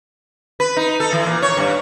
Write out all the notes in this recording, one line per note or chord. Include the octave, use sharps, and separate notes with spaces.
B4
D#4
A4
E3
A#2
C#5
G2